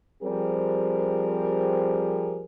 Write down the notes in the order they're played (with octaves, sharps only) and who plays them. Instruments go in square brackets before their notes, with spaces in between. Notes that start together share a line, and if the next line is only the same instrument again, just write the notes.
[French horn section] F3 G3 C4 G4 G#4 A#4